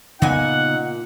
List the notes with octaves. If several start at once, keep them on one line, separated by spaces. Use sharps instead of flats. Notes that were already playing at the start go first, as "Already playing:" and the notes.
A#2 C#3 B3 D#4 F#5 G#5